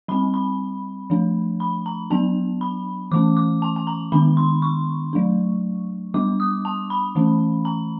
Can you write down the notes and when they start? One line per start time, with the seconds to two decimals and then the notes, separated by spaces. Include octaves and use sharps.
0.08 G3 C4 B5
0.34 B5
1.10 F3 A3 D4
1.60 B5
1.86 A#5
2.10 F#3 B3 D4 A5
2.61 B5
3.11 E3 A3 C#4 D6
3.37 D6
3.62 A5
3.76 A5
3.87 A#5
4.12 D#3 G#3 B3 D4 B5
4.37 C6
4.62 C#6
5.13 F#3 A3 D4
6.14 G3 B3 D4 D6
6.40 D#6
6.65 A5
6.90 B5
7.15 E3 A3 C#4
7.65 A#5